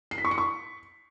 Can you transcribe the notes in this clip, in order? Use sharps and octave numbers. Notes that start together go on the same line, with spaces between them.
C7
B6
C#6
C#7
C#6